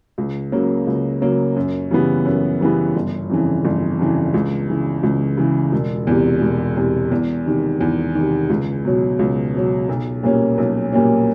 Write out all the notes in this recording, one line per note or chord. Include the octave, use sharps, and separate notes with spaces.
C#2
C#3 F#3 A#3
C#2
C#3 F#3 A#3
F#2
C#3 E3 G3 B3
F#2
C#3 E3 G3 B3
G1
F2 C#3 E3
G1
F2 C#3 E3
C#2
C#3 E3
C#2
C#3 E3
E1
E2 C3
E1
E2 C3
E2
C3 D#3
E2
C3 D#3
C#2
B2 F#3
C#2
B2 F#3
B1
A#2 G3 A#3 C#4
B1
A#2 G3 A#3 C#4